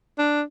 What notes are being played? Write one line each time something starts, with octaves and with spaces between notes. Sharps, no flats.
D4